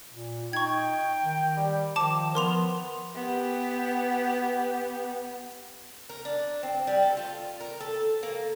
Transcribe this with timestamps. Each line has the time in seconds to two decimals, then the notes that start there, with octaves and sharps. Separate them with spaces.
0.12 A#2
0.53 D#4 G5 C#6 G#6
1.23 D#3
1.57 G3
1.96 D#3 F3 A5 D6 E7
2.35 F3 B3 A#4 C6 F7
3.15 B3 G4
6.09 A#4
6.25 D4
6.63 C4
6.87 G3
7.02 A4
7.17 F4
7.60 A#4
7.81 A4
8.23 A#3